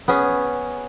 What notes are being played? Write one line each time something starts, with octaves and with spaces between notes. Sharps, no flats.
B3 C#4 G#4